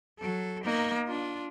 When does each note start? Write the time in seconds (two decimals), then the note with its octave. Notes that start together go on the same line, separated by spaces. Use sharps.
0.20 F#3 A4
0.64 A#3 D#4
1.07 D4 F4